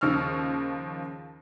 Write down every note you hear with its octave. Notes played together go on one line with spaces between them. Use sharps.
D#2 C#3 F3 C#6 E6 F6